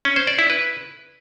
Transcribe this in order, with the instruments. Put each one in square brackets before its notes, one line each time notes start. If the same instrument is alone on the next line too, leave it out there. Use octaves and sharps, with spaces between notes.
[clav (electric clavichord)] C#4
C5
D5
E4
B4